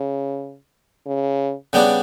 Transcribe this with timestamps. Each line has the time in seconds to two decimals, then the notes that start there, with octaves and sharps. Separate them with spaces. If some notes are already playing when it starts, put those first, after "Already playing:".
Already playing: C#3
1.06 C#3
1.73 C#3 G3 B3 D4